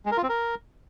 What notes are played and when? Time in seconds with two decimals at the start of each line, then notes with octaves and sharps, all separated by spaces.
0.06 G#3
0.12 A#4
0.17 F4
0.23 C4
0.29 A#4